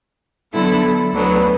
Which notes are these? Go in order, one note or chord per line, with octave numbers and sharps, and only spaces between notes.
D3 F#3 B3 E4 A4
D2 D3 F#3 B3